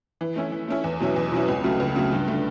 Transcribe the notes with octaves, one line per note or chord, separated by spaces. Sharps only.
E3
A3 C#4 E4
E3
A3 C#4 E4
E2
B2 F#3 C#4 E4
E2
B2 F#3 C#4 E4
C#2
C#3 F#3 A3
C#2
C#3 F#3 A3
G2
D3 A3